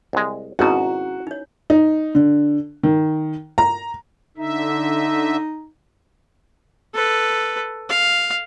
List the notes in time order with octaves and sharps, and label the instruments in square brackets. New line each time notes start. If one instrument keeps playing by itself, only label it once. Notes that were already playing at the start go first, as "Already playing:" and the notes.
[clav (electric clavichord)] C2 G#3
[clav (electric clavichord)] G#1 B2 [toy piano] C#4 E4 A#5 [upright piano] F#4
[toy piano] D#4 C#5
[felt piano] D#4
D3
D#3
A#5
[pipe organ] D3 E5 [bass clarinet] D#4
[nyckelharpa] A4 B4
F5